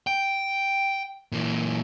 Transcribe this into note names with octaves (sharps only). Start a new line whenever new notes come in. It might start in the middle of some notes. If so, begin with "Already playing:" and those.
G5
A#2 E3